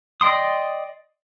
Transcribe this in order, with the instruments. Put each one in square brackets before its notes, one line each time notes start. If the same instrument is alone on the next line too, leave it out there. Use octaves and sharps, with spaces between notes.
[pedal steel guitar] D5 D#5 G5 C6 D#6